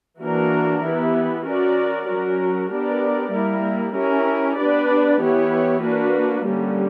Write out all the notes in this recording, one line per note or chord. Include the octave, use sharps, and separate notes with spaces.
E3 A#3 D4 F#4 A#4
E3 B3 E4 G4
C#4 F#4 A#4 D5
F#3 C#4 F#4 A#4
B3 D4 G4 A#4 D5
G3 A#3 E4 A#4
C#4 E4 G4 A#4
B3 D4 G4 B4 D5
E3 B3 E4 G4 C#5
A#3 D4 F#4 B4
D3 G3 A#3 C#4 G4